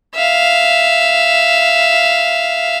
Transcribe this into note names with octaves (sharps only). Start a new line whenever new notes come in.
E5 F5